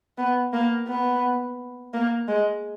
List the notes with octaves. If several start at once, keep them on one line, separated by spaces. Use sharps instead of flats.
B3
A#3
B3
A#3
G#3